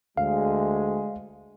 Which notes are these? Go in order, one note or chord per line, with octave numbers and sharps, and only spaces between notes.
D2 G#3 F5